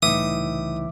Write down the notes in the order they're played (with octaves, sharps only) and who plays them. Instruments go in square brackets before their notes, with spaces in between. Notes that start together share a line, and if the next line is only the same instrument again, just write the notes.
[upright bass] C2 C#3 [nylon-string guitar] A2 D#4 [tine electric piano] E3 E5 D6 [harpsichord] D#6